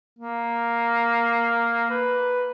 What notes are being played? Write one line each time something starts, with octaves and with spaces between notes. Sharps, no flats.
A#3
B4